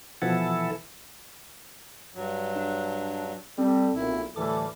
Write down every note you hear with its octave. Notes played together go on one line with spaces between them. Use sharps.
B2 E3 F3 E4 A4 F#5
G2 F#3
D4
G3 C4 A4
B1 A#2 E4
D2 A2 E3 G3 A4 D6